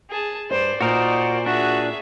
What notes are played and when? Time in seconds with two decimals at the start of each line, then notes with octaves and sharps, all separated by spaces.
0.11 G#4 A5
0.51 G2 C5 D5
0.81 A#2 D#4 F#4 A#4 C5 D5
1.46 D4 F#4 G#4 E5